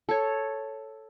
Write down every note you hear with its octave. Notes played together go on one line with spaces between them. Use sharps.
A4 C#5